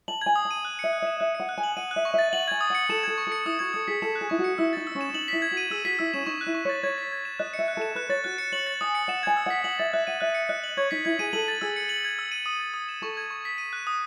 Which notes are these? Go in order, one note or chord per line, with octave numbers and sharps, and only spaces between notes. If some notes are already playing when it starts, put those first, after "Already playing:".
A5 F#7
G#5 G#6
D#6
A5
D#7
F#6
E5 C#7
F#6
E5 E7
E5 F#6
F#5 C#7
F#6
G#5
F#7
F#5 D#7
F#6
E5
C#6
E5 A6
F#5 F#7
G#5 G#6
D#6
F#5 C#7
A4 E7
A4 G#6
C#6
A4 C#7
E4 D#6
F#4 G#6
A4 D#6
G#4 B6
A4 E7
F#6
G#4
E4 C#6
F#4
C#7
E4 E6
D#4 A6
E6
C#4
E7
D#4 F#7
E4 B6
G#6
F#4
D#7
G#4 E6
F#4 B6
E4 E6
C#4 E7
D#4 C#6
F#6
E4
C#6
C#5 A6
C#5 G#6
B6
G#6
E7
D#5 F#6
C#7
E5
F#6
A4 E7
B4 F#6
C#5 A6
F#4 F#6
C#7
C#5 F#7
A6
G#5 D#6
C#7
F#5 E7
G#5 G#6
E6
F#5 B6
F#5 F#7
E5 A6
E5 F#6
F#5 D#7
E5 F#6
C#7
D#5 F#6
F#7
C#5 G#6
D#4 B6
E4 G#6
G#4 D#7
A4 F#7
A6
G#4 E6
C#7
F#7
G#6
E6
D#7
D#6
A6
D#6
E7
A4 C#6
G#6
C#6
B6
D#7
F#6
D#6